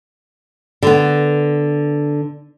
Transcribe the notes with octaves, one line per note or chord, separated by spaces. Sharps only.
D3 B3